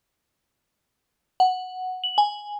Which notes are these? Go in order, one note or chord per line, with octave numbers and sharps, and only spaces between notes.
F#5
F#7
G#5